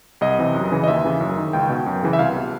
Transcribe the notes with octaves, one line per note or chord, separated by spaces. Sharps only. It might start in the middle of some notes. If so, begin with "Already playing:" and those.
C2 D#5
C3 E3
F#2
C#3 E3
D#5
D#2 E5
C#3 E3
F#2
D#3
C#2 G5
B2
F#2
C#3 E3
E5
C2 F5
B2